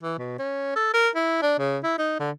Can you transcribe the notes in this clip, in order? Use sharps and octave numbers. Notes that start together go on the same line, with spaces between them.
E3
B2
C#4
A4
A#4
E4
D4
C#3
E4
D#4
D3